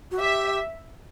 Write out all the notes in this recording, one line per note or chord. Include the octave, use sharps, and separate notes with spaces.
F#4
G4 E5